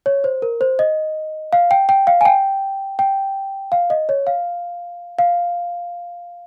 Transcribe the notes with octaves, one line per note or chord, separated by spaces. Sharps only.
C#5
C5
A#4
C5
D#5
F5
G5
G5
F5
G#5
G5
G5
F5
D#5
C#5
F5
F5